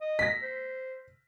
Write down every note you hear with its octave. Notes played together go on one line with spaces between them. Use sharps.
D#5
A#6 B6
C5